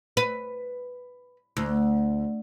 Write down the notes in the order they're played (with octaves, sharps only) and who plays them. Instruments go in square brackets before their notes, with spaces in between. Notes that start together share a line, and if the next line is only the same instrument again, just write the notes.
[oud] B4
D2